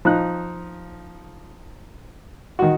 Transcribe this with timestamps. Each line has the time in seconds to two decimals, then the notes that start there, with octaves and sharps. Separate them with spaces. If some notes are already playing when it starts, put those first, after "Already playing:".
0.05 F3 D#4 F#6
2.59 D#3 F#4